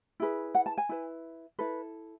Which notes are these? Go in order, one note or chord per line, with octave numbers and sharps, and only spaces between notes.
E4 G#4 B4
F#5
A5
G#5
E4 B4
E4 A4 B4